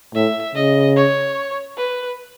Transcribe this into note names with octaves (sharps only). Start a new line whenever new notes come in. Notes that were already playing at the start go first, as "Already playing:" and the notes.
A2 E5
C#3 D#5
C#5
B4